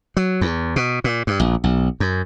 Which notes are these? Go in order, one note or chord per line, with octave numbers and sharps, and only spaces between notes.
F#3
E2
B2
A#2
G2
A#1
B1
F#2